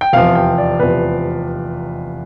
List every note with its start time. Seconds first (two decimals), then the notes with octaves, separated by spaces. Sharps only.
0.01 G5
0.13 F1 E2 C3 F3 F5
0.35 G5
0.58 D5
0.79 F1 E2 C3 F3 B4